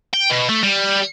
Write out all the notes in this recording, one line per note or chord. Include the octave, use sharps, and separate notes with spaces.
G5
B2
A3
G3